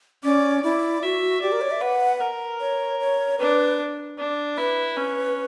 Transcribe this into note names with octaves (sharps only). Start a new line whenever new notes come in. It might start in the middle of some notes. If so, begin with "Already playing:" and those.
C#4 D5
E4 D5
F#4 E5
G4 D5
A#4
C#5
E5
B4 F#5
A#4
C#5
C#5
D4 B4
D4
E4 B4
C#4